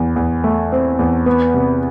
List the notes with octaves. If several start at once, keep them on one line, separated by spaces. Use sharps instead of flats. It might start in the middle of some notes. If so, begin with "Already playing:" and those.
Already playing: E2
E2
A3
C4
E2
B3
C3